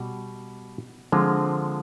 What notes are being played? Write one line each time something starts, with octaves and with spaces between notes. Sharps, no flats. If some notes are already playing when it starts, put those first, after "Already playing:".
Already playing: B2 G3
D3 F3 G#3 C4 F4